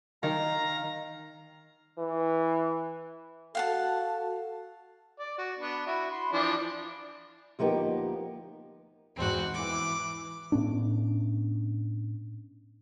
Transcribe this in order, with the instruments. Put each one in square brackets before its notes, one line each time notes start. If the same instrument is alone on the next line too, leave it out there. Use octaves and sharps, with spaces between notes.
[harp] D#3 [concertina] F5 A#5
[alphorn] E3
[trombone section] F#4 A4 [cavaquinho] F5 F#5 A5
[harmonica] D5
F#4
B3 D4 F#5
E4 F#4 E5
B5 C6
E3 F3 D4
[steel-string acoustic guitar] D2 F3 A#3 B3 D#4 G4
[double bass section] E2 G#2 [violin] C4 F#4
[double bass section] E3 [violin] D6
[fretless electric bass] A2 B3 C#4 D4